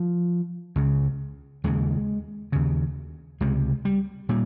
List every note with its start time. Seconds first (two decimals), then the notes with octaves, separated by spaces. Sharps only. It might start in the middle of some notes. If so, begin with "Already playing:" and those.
Already playing: F3
0.76 C#2 C#3
1.64 D#2 C#3 G#3
2.52 D#2 C#3
3.41 C#2 C3 G#3
3.85 G3
4.29 A#2 G3